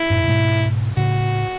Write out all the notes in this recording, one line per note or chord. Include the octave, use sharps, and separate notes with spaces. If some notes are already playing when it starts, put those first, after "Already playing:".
Already playing: E4
F#2 A2
A2
G#2 B2
A2 C#3 F#4